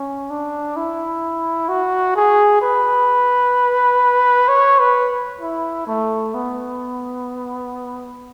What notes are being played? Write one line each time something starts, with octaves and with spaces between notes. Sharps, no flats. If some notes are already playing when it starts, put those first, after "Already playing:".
Already playing: C#4
D4
E4
F#4
G#4
B4
C#5
B4
E4
A3
B3